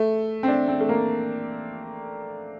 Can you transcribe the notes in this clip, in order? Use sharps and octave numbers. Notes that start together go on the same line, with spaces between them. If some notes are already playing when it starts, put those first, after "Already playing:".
Already playing: A3
C4
D4
C4
A3
A#3